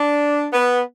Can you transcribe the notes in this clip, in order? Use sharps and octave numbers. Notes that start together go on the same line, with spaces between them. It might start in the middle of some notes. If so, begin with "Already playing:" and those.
Already playing: D4
B3